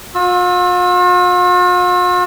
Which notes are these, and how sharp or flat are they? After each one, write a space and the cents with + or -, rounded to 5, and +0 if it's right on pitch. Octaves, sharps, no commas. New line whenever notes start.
F4 +45 E6 +0